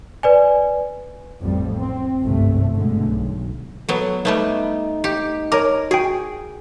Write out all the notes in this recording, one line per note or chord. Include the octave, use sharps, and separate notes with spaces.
B4 D5 G#5
A1 F2 G3
C4
G1 C2 G#2 C3 A3
B2 D3 G#3 A3
B1
F#3 B3 A4
G3 A3 B3 D#4
G4
A#4 C#5 A#5 D6
F#4 G#4 G5